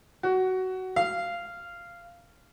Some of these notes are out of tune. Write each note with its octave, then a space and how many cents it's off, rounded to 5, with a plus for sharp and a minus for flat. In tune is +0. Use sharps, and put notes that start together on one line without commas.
F#4 +15
F5 -15